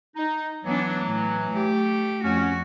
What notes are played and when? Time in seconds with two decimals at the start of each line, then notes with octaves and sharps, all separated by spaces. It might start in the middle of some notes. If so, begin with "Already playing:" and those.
0.16 D#4
0.65 E3 F#3 B3 D4
1.06 A2
1.51 A3 G4
2.24 F2 C#4 F#4